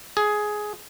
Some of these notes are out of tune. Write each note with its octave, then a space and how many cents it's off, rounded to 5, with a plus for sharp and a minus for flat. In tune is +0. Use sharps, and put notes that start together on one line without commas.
G#4 +10